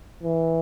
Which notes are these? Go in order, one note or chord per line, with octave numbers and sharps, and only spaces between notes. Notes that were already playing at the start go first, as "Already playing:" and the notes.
E3